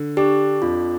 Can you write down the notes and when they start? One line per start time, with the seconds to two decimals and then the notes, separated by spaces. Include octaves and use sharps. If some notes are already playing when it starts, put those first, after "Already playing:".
Already playing: D3
0.17 D4 G4
0.62 F2 F4